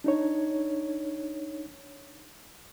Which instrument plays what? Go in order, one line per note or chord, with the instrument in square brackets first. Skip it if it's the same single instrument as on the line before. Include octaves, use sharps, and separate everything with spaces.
[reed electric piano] D4 D#4 C#5